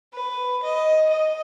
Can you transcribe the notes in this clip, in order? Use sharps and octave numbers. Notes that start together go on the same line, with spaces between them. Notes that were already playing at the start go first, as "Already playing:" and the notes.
B4
D#5
D#5